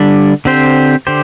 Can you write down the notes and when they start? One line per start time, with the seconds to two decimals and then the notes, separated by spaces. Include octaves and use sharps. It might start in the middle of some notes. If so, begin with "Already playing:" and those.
Already playing: D3 G3 D4
0.45 D3 C4 G4 C5
1.07 D3 G4 C5